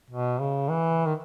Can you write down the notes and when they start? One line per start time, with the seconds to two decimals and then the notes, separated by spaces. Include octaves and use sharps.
0.10 B2
0.40 C#3
0.69 E3
1.06 D#3